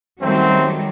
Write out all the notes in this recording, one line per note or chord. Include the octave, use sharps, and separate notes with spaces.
F#2 D#3 F#3 G3 A3 C4